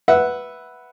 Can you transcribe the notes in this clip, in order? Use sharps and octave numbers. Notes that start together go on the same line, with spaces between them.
B4 E5 F#5